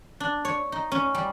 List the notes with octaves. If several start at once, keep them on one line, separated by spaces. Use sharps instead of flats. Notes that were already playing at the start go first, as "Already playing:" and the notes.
D4
C#5
D#4
C#4
G3